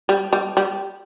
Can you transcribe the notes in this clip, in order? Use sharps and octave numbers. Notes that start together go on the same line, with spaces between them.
G3
G3
G3